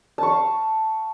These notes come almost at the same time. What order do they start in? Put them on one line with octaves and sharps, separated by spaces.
A5 C#6 F5